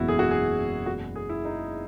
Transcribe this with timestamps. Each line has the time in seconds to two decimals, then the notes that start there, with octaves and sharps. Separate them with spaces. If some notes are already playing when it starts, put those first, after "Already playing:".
Already playing: F#1 E2 B2 G#3 B3 E4 F#4
0.08 G#4
0.19 F#4
0.31 G#4
0.86 F#4
1.16 G#4
1.29 E4
1.45 D#4